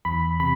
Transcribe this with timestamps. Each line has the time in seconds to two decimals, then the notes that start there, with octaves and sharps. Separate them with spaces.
0.05 E2 B5
0.40 C3 B5